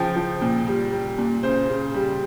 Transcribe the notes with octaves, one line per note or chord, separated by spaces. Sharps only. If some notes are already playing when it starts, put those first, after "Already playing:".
Already playing: C#3 F3 G5
F3
A#2
G3
G3
A#2
C#3 C5
C#3
G3